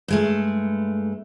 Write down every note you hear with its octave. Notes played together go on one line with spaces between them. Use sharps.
G2 G#3 A3